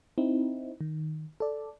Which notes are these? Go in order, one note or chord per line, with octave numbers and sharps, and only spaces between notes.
C4 D#4 E4
D#3
A4 D5